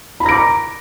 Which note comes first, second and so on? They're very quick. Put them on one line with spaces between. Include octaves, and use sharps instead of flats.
B5 A#5 A#6 D7 D6